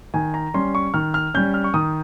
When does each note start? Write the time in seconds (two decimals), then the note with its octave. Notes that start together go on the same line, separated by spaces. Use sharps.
0.14 D#3 G#5
0.34 A#5
0.54 G3 C#4 C6
0.75 C#6
0.94 D#3 F6
1.14 F6
1.34 G3 C#4 G6
1.54 F6
1.64 C#6
1.74 D#3 D#6